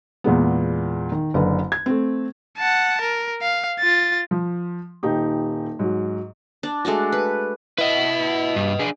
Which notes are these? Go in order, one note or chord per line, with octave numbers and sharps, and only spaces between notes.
E2 A#2 G#3 B3
D#3
F#1 D3 B4
G#6
A3 C4
F#5 A5
A#4
F5
F4 A6
F3
D#1 D#4 G4
G#2 F#3
D4
G#3 A3 D4 F#4
B4
E4 B4 D#5
G2
D4 G#4